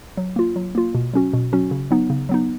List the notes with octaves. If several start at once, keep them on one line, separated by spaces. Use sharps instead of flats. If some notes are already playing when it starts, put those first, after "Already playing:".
F#3
A#3 F4
F#3
A#3 F4
B2
F#3 C#4 F#4
B2
F#3 C#4 F#4
C#3
F#3 B3 D#4
C#3
F#3 B3 D#4